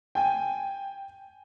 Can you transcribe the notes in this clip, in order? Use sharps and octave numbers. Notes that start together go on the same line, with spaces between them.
G5 G#5